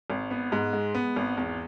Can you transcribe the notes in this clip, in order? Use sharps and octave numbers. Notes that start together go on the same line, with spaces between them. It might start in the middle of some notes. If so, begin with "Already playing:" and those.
G#1
B3
G#2
G#3
B3
G#1
E2